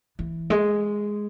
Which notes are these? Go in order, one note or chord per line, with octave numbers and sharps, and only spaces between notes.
E3
G#3